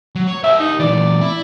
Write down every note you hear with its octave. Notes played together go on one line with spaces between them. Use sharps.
F#3
C#5
G4 A#4 E5
D#4
A#2 E3 D5
E4